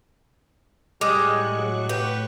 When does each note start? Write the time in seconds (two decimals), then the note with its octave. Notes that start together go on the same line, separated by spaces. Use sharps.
1.01 A2 G3 G#3 C#6 D6 F#6
1.57 F#3
1.89 G4 B4